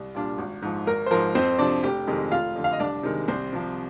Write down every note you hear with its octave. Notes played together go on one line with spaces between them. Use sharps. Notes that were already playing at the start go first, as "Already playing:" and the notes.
Already playing: C2
A#2 G3 D4 F4
G#1
G#2 F3
G#1 A#4
C5
G#2 F3 A#4
F2 C4 C5
C3 F3 D4 D5
F1 G4 G5
F2 C3 D#3 G#3
F1 F4 F5
F2 D3
F5
D#5
C2 D4 D5
C3 D#3 G#3
C2 C4 C5
C3 F3